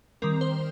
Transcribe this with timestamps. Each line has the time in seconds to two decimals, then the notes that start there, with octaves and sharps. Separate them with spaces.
0.22 D#3 G3 C4 A#4
0.41 C5